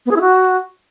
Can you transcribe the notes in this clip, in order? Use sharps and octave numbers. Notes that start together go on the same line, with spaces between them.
B3
G#4
E4
F#4